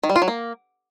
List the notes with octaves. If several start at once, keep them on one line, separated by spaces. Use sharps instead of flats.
D#3
G3
F4
F#3
A#3